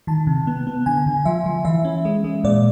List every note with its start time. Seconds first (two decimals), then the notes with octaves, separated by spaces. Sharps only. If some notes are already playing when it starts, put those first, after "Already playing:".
0.07 D#3 A5
0.27 C3
0.47 B3
0.67 B3
0.86 D3 G#5
1.06 D3
1.25 F3 E5
1.46 F3
1.65 E3 E5
1.85 C#4
2.05 G#3
2.24 G#3
2.44 A#2 D5